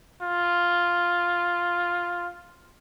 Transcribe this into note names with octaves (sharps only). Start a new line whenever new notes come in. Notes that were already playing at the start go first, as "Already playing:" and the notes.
F4